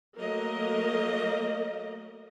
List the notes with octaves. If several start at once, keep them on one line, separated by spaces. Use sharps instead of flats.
F#3 A3 A#3 A#4 D#5